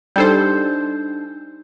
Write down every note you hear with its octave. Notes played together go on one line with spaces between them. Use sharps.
G3 D4 D#4 A4 C5 G6